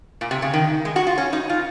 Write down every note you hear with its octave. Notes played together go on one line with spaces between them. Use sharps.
A#2
C3
C#3
D#3
G#3
F#4
F4
C#4
D#4
F4